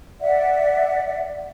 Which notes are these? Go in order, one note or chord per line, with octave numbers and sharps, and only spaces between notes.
D5 E5 F#5